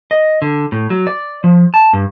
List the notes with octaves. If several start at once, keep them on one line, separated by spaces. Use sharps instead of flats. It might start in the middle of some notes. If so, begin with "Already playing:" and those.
D#5
D3
A2
F#3
D5
F3
A5
G2